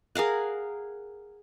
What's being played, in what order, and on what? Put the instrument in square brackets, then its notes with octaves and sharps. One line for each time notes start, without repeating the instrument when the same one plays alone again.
[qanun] G#4 A#4 F5 F#5